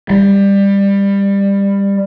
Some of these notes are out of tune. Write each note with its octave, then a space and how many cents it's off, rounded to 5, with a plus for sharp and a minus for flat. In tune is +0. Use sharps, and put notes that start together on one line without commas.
G3 +20